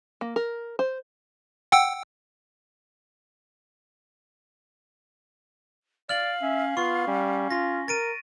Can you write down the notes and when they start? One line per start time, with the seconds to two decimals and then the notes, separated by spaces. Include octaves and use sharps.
0.21 A#3
0.36 A#4
0.79 C5
1.72 F#5 G5 E6
6.09 D5 F5 F6 F#7
6.42 C#4 E5
6.77 B3 F4 C#6
7.07 G3 C#4
7.51 F4 A#6
7.88 A#4 A6 D7 D#7